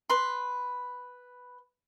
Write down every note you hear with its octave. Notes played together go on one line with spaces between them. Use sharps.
B4 C6